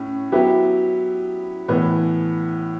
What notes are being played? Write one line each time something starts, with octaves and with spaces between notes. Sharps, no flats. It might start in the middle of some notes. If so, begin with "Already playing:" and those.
Already playing: A2 C#4
F#3 B3 E4 G4
A2 E3 B3